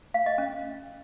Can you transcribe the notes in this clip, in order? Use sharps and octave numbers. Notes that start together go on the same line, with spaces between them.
F5
D#5
C#4